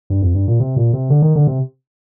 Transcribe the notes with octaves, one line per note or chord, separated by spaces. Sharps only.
G2
F2
G2
A#2
C3
A#2
C3
D3
D#3
D3
C3